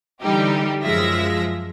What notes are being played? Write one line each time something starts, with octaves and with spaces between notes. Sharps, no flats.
D3 E3 G3 D#4 G4
F#2 F3 G#3 F4 E5 A#6